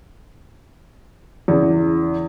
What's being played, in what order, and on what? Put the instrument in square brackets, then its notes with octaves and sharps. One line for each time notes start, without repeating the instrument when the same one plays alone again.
[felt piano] E2 C#3